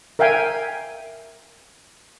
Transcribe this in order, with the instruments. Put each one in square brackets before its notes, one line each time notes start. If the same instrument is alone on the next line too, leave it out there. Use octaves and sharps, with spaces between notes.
[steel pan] A#4 E5 F5 G5 G#5